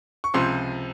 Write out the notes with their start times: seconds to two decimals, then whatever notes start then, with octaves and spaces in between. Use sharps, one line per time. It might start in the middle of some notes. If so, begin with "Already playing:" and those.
0.24 C#6
0.34 C#2 C3 F3 C6